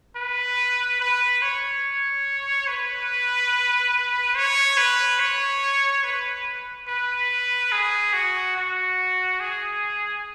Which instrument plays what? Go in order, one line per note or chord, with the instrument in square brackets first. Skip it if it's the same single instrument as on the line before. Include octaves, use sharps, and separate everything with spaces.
[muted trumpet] B4
B4
C#5
B4
C#5
B4
C#5
B4
B4
G#4
F#4
F#4
G#4